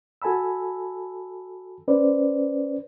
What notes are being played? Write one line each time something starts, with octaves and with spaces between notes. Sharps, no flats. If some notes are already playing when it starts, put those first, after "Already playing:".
F#4 A4 G#5 A5 B5 E6
C#4 B4 C5 D5